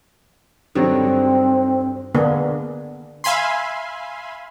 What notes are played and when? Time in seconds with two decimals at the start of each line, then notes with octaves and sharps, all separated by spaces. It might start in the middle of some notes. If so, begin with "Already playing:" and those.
0.75 G2 D3 D#3 F#3 C4
2.15 D3 A#3 B3 D4 G#4
3.24 E5 F5 G#5 B5 C6